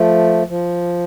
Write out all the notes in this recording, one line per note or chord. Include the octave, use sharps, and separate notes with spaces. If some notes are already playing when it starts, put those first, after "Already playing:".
Already playing: F3 A3
F3